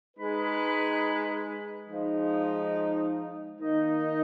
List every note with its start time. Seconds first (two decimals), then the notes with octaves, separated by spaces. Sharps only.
0.16 G#3 D#4 G#4 B4
1.88 F3 G#3 D#4
3.60 D#3 A#3 D#4